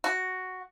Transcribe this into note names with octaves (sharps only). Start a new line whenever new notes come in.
F#4